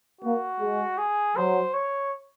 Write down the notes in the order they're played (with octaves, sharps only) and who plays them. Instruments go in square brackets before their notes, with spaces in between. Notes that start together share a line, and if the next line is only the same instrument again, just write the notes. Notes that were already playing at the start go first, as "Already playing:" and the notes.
[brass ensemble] A#3 [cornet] F#4
[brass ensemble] G#3
[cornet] G#4
[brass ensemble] F#3 [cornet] C5
[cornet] C#5